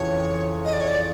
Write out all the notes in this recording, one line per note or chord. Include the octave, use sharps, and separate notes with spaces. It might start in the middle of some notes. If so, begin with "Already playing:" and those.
Already playing: F2 C#3 E3 C#5
D#5
D5
C#5
D5